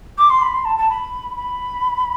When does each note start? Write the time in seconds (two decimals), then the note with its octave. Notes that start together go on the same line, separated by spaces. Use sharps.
0.18 D6
0.30 C6
0.42 B5
0.54 C6
0.65 A5
0.77 A5
0.90 B5
1.37 B5